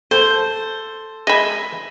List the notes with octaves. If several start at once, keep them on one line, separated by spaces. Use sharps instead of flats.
A4 C5
G#3 D#5 E5 G#5 B5